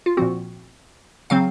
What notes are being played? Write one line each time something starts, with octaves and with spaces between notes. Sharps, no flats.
F4
A#2 F3 C4 F#4
C#3 F#3 C4 F5